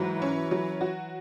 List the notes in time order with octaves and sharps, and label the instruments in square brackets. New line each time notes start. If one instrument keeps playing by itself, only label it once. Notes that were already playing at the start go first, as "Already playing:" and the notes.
Already playing: [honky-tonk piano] G#2 F#3 [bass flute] E3
[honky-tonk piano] C#4
F#3
F#4